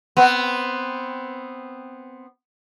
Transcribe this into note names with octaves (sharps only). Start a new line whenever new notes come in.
B3 C4